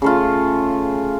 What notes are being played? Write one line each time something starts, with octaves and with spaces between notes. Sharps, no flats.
C#3 A3 F4